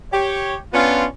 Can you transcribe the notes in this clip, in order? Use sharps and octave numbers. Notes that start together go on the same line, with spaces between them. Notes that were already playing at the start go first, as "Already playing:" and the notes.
G4 C#5
B3 C#4 D4 F4